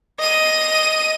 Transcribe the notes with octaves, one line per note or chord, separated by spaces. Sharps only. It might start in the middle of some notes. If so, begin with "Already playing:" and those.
D#5 D#7